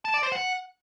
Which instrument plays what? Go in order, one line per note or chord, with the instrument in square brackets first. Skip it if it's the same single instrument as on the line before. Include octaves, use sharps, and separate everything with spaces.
[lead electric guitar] A5
D5
C5
F#5